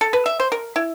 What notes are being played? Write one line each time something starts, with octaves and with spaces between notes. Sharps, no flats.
A4
B4
E5
C5
A#4
E4